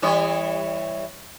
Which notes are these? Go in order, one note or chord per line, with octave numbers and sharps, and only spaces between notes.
E3 G3 C#5